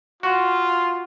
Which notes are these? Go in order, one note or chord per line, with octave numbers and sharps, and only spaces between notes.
F4 F#4